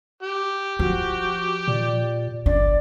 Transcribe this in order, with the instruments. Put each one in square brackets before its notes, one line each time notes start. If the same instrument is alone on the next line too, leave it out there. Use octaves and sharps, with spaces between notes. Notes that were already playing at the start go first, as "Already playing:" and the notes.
[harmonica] G4
[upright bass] F3 [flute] F#4
[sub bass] A#2 [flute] D5
[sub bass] G1 [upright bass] D4 [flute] D5